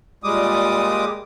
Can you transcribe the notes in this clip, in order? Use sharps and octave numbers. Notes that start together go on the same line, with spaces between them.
A#2 G3 G#3 D6 D#6